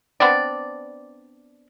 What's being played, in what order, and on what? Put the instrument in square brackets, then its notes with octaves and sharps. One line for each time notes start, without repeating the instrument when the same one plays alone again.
[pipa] B3 C4 D4 D5